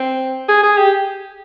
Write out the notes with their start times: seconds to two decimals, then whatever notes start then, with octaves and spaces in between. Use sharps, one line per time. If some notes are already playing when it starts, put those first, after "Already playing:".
Already playing: C4
0.49 G#4
0.63 G#4
0.77 G4